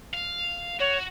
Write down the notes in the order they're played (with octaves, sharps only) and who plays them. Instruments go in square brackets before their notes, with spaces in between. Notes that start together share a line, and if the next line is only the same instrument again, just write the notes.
[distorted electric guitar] F5
[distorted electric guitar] F#4 [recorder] C#5